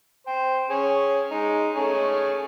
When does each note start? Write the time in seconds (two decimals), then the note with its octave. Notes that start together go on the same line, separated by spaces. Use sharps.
0.27 C5 G5
0.70 C#4 G#4
1.31 G#3 D#4
1.75 A3 C#4 G#4